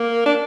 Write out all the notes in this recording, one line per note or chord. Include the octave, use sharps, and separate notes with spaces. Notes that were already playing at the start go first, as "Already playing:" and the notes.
Already playing: A#3
D4